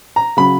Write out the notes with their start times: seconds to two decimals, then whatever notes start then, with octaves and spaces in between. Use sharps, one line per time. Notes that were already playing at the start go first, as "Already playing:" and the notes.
0.16 A#5
0.37 C#3 F#3 B5